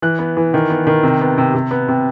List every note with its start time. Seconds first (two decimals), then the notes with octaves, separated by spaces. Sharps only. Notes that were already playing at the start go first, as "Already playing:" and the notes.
0.02 E3 F#6
0.19 B3
0.37 E3
0.54 D#3
0.70 B3
0.87 D#3
1.03 C3
1.21 B3
1.38 C3
1.54 C3
1.71 B3
1.88 C3